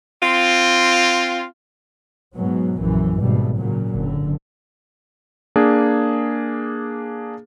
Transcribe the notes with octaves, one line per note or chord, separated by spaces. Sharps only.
C4 F4
G#2 B2 F#3
A#1 F#2 E3
G#1 B2 G3 A3
A#2 C#3 F#3
F#1 D3
A#3 D4 G#4